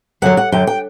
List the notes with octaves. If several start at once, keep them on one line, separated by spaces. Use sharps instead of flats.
F#2 D3 F#3 F#5
F#5
F#2 D3 F#3 G5
G5